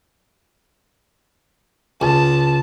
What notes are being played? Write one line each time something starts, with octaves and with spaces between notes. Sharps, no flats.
C#2 A5